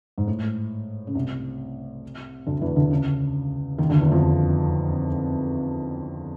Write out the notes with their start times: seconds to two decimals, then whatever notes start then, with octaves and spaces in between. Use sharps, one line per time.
0.18 G#2
0.27 A2
1.07 C#3
1.15 C2 C3
2.47 D2 D3
2.61 E2 E3
2.76 D2 D3
2.91 C#2 C#3
3.78 D#2 D#3
3.90 D2 D3
4.00 E2 E3
4.11 F2 F3